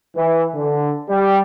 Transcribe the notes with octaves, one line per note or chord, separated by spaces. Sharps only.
E3
D3
G3